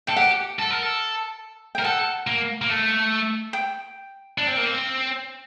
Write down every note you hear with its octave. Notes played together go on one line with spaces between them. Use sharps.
A4 G5
G4 F#5
A4
A#4
A4
A#4 G5
A4 F#5
A#3
A#3
A3
G5
D4
C4
A#3
C4